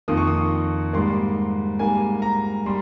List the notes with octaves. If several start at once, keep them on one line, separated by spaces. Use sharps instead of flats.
F2 D#3 A#3 D#6
C#6
D#6
G#2 G3 A#3 C6
G#2 G3 A#3 G#5
A#5
G3 C6